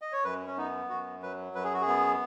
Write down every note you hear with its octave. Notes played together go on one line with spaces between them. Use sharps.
D#5
C#5
F#2 B4
C#4
B3 D#4
F#2 F#4
F#3 B4
F#2 B4
G#4
F#4
G#4
B3